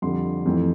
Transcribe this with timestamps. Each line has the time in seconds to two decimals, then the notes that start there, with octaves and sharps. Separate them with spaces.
0.02 F2 D3 G3 C6
0.46 F2 E3 A3 C4